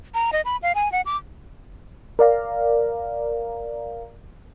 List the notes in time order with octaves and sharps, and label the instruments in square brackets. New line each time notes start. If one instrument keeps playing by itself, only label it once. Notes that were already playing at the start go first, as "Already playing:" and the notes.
[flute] A#5
D#5
B5
F5
G#5
F#5
D6
[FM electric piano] A#4 D5 F5 A#5